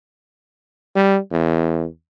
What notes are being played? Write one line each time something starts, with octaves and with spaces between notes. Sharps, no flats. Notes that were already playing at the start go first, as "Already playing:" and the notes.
G3
E2